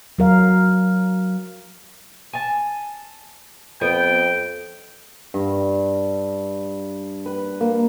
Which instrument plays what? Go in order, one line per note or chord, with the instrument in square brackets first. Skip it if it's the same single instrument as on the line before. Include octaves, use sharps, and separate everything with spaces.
[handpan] F#3 A#4 F5
[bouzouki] G#5 A5
[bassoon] F2 [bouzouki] B3 [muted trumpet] G5
[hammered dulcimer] G2
B4
A#3